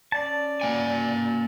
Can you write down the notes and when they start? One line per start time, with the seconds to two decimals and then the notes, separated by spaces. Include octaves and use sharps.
0.12 C#4 D5 A5
0.61 A#3 F#5 G#5